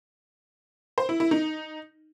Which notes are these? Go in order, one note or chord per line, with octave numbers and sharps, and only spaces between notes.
C5
E4
E4
D#4